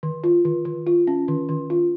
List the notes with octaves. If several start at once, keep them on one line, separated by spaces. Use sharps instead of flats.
D#3
F4
D#3
D#3
F4
C#4
D#3
D#3
F4